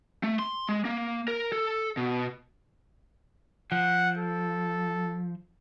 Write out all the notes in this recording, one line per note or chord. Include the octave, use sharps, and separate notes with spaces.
A3
C6
G#3
A#3
A#4
A4
B2
F3 F#5
A4